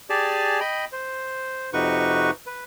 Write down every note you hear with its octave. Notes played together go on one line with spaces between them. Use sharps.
G4 G#4 D5 G#5 A5
D#5 G5 B5
C5
F2 C3 D#4 F#4 B4 C#6
B4